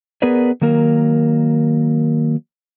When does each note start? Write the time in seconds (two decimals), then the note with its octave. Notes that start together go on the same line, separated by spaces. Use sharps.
0.22 B3 G#4 A#4 B4 D5
0.61 D#3 F#3 A#3 A#4